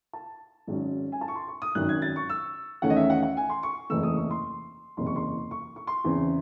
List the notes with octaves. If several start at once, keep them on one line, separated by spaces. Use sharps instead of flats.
A5
G#1 G#2 F#3 C#4
G#5
A5
C#6
C6
C#6
D#6
G#1 F#2 D#3 F#6
G#6
A6
C#6
E6
E2 D#3 A3 C#4 F#5
D#5
E5
F#5
F#5
G#5
C6
C#6
F#1 E2 C3 E3 A3 E6
D#6
C#6
C6
F#1 E2 C3 C6
C#6
C6
C#6
C#6
C6
E2 C#3 E3 C4